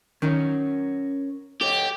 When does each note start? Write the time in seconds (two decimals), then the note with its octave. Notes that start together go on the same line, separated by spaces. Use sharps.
0.22 D#3 C#4 A#4 C#5
1.61 G4 A4 C#5 D#5